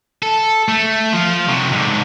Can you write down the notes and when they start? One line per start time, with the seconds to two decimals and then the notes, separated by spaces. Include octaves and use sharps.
0.23 A4
0.68 A3
1.13 F3 F4
1.48 C3 F#3
1.72 G#2 D3